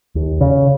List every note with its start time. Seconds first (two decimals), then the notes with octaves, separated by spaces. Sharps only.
0.15 D#2
0.41 C#3